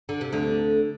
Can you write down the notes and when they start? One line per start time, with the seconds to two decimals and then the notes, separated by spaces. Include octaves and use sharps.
0.09 D3
0.21 C3
0.33 D2 D3